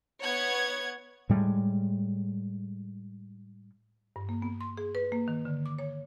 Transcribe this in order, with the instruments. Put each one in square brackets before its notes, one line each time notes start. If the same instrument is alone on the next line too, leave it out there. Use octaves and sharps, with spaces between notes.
[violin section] B3 C#5 F#5 G#6
[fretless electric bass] A2 G3 G#3
[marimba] G2
A#3
B3
C6
G#4
B4
A#3
D#3
D3
D6
C#5